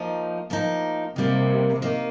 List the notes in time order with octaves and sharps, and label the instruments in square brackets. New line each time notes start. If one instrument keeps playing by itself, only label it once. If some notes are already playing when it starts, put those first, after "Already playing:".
Already playing: [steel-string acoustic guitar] F3 A#3 D#4
F3 A#3 D#4
[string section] C3 [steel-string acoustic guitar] D#3 G3 A#3
[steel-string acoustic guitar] D#3 A#3 D#4